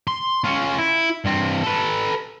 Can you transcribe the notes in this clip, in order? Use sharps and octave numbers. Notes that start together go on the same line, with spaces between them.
C6
C#4 F4
E4
G2 C4
A4 B4